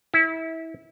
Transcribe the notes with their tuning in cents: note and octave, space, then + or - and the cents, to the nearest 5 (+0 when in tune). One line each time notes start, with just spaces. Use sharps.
E4 -25